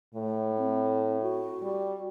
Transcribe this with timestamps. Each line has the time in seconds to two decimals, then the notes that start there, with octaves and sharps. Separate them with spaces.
0.14 A2 A3
0.58 C4
1.22 F#4
1.62 G3